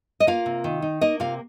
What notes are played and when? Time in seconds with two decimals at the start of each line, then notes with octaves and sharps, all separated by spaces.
0.20 D#5
0.27 A#3 F4 F5
0.46 C3
0.64 D#3
0.82 D#4
1.01 A#3 D#4 D#5
1.20 C3 F4 F5